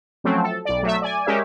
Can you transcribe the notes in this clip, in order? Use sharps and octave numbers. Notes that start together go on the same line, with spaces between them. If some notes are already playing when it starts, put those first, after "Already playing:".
F3 F#3 A3 C4 C#4
A4
B1 D5
F#3 A3 E5
D5 G#5
G#3 C#4 G4 A#4 E5